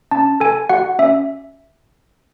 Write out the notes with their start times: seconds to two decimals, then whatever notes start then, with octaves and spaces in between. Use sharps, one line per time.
0.11 C#4 A5
0.40 A4 G#5
0.69 F#4 F#5
0.99 C#4 E5